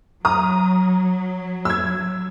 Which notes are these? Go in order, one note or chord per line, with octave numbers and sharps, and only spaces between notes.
F#3 A#5 D#6
E6 G#6